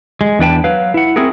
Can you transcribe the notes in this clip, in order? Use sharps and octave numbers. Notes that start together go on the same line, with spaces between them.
G#3
E2 D4 B4 G5 A5
F#3 B4 F5
E4 F#5
C4 E4 F#4 G#4 A#4